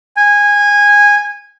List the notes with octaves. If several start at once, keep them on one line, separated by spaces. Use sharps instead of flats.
G#5